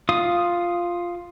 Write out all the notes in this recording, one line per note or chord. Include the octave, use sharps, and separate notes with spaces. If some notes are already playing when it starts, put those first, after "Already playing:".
F4 F5 D#6